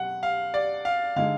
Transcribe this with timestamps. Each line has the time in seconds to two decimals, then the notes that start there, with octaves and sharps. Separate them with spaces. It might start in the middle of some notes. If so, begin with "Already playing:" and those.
Already playing: B2 F#3 F#5
0.23 F5
0.54 D5
0.85 F5
1.16 D3 G#3 D#4 F5